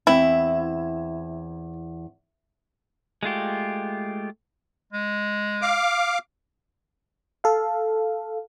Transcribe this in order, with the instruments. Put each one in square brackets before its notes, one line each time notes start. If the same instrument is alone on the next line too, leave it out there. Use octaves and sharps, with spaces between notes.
[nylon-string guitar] E2 C4 [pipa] E4
[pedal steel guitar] G#3 A3 F4 G4
[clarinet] G#3
[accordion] F5 D6
[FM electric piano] A4 F5